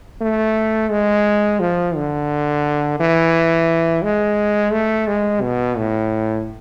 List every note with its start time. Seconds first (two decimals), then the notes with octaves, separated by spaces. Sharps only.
0.21 A3
0.91 G#3
1.60 F3
1.96 D3
3.00 E3
4.03 G#3
4.72 A3
5.07 G#3
5.42 B2
5.77 A2